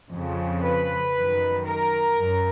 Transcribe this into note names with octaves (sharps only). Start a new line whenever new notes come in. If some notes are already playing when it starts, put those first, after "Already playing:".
F2 C#3 F3
B4
F#2 D#3
A#4
F#2